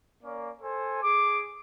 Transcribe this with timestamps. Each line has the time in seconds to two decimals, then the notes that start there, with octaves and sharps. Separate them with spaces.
0.23 A#3 C#4 D5
0.62 A4 C5 G#5
1.03 G#4 D6